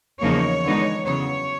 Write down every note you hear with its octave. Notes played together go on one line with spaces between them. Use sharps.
E2 C#3 F3 A#3 D#4 C#5
D3 F3 G#3 B3 D#4
E2 C#3 F#3 B3 C#5